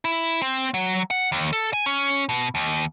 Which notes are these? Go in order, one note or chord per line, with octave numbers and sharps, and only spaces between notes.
E4
C4
F#3
F#5
D#2
A4
G#5
C#4
B2
D#2